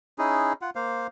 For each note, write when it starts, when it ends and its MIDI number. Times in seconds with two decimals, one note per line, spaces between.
0.18 0.53 61
0.18 0.53 63
0.18 0.53 64
0.18 0.53 68
0.62 0.70 65
0.62 0.70 78
0.76 1.07 58
0.76 1.07 72
0.76 1.07 77